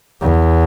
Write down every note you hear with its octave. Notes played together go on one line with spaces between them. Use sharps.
E2